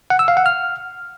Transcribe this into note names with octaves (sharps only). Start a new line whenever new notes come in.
F#5
E6
F5
F#5
F6